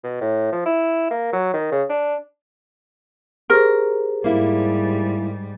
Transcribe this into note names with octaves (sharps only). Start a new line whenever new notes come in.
B2
A2
F3
E4
A#3
F#3
D#3
C#3
D4
G4 G#4 A#4 C5
G#2 G3 A#3 E4